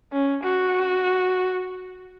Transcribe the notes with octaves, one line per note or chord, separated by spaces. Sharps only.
C#4
F#4